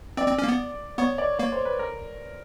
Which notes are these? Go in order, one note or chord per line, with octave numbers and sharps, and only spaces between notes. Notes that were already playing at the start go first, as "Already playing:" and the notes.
C4 D5
C4
C#4
A#3
B3
B3 C#5
D5
A#3 C#5
C5
B4
A#4